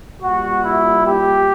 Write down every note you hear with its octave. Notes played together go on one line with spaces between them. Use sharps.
A#2 G3 F#4
E4
G4